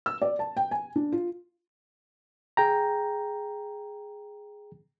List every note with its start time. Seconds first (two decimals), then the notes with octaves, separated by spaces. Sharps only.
0.06 E6
0.22 D5
0.39 A5
0.57 G5
0.71 G#5
0.96 D4
1.12 F4
2.57 G#4 G5 A#5